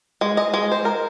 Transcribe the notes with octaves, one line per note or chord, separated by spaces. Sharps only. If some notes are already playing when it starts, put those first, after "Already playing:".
G#3
D#5
G#3
C5
A#4